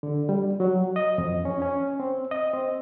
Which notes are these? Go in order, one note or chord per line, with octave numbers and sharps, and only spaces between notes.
D3
G3
F#3
D#5
F2
C#4
C#4
C4
D#5
C4